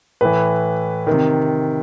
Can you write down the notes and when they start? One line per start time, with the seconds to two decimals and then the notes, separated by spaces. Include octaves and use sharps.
0.21 A2 E3 B4
1.07 C3 D#3